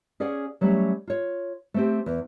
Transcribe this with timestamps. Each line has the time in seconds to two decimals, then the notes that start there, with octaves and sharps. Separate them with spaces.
0.20 C#4 G#4 D5 F5 F#5
0.61 F#3 G3 A3 C#4
1.07 F4 C#5
1.74 A3 C4 G4
2.06 E2